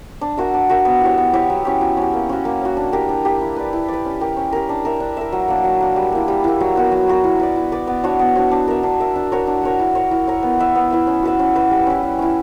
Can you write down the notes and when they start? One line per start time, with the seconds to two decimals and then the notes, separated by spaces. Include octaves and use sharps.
0.21 D4
0.37 F#4 A#4 E5
0.54 D4
0.70 F#4 A#4 E5
0.85 B3
1.02 E4 G4 C#5
1.18 B3
1.33 E4 G4 C#5
1.50 F#3
1.65 C#4 G4
1.81 F#3
1.97 C#4 G4
2.14 A#3
2.29 C#4 F#4
2.45 A#3
2.61 C#4 F#4
2.77 D4
2.93 G4 A#4
3.09 D4
3.25 G4 A#4
3.41 E4
3.56 B4 D5
3.73 E4
3.88 B4 D5
4.05 C#4
4.21 G4 A#4
4.37 C#4
4.52 G4 A#4
4.69 D4
4.85 A#4 E5
5.00 D4
5.17 A#4 E5
5.32 F#3
5.48 A#3 D4
5.64 F#3
5.81 A#3 D4
5.96 G3
6.12 A#3 E4
6.28 G3
6.44 A#3 E4
6.60 F#3
6.76 B3 F#4 A#4
6.92 F#3
7.08 B3 F#4 A#4
7.24 E4
7.40 B4 D5
7.56 E4
7.72 B4 D5
7.87 B3
8.04 D4 F#4 C#5
8.19 B3
8.35 D4 F#4 C#5
8.51 D4
8.68 A#4 E5
8.83 D4
9.00 A#4 E5
9.16 D4
9.32 F#4 A#4 C#5
9.47 D4
9.63 F#4 A#4 C#5
9.79 E4
9.95 A#4 C#5
10.11 E4
10.27 A#4 C#5
10.43 B3
10.59 E4 B4 E5
10.75 B3
10.91 E4 B4 E5
11.07 C#4
11.23 F#4 B4 E5
11.39 C#4
11.55 F#4 B4 E5
11.71 G3
11.87 C#4 E4
12.03 G3
12.19 C#4 E4